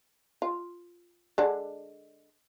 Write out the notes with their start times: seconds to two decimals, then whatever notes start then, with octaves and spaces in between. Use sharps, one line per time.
0.42 F4
1.38 D3 G#3 D4